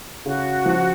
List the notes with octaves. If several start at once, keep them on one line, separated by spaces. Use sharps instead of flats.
C#3 F#4
F3